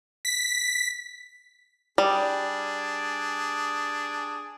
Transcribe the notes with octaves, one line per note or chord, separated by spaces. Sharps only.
B6
G3 D4 G#4